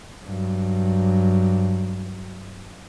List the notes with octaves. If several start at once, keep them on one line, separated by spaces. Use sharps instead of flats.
G2 F#3